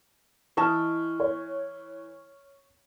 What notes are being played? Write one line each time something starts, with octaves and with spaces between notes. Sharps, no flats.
E3 E4 D#5 A5 C#6 F6
C#5